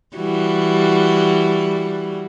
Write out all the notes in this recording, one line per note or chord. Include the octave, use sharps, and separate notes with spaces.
E3 G3 F#4